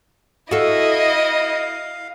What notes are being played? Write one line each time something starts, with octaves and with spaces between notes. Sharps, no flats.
E4 F#4 A4 D#5 F5